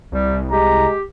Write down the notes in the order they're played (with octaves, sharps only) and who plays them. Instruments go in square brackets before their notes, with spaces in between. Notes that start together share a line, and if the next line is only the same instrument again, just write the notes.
[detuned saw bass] C2 [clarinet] G3
[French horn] G#3 [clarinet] G4 [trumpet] A#5